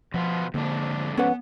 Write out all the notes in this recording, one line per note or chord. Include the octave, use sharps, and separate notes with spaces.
B2 F3 B3 F4
F2 G#2 D3 A#3 D4
B3 C#4 B4 F#5